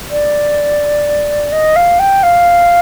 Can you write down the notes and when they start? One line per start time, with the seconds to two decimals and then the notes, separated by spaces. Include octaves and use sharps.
0.10 D5
1.52 D#5
1.76 F5
1.99 G5
2.23 F5